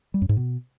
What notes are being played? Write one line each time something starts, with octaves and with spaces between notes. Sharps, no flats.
G3
F#2
G#2
B2